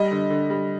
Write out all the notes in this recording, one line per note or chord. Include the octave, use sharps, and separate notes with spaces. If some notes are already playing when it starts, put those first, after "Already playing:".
Already playing: G3 D#5
D3
D3
G3